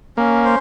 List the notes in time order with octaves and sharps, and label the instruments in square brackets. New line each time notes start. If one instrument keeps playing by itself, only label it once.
[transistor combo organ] A#3 [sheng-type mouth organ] C#4
[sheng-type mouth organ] C5